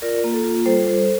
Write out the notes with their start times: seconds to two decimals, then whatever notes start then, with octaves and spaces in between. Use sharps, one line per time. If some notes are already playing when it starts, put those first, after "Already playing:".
0.02 F4 A#4 D5
0.24 A#3
0.34 A4
0.44 F4
0.66 G3 A4 C5
0.87 G3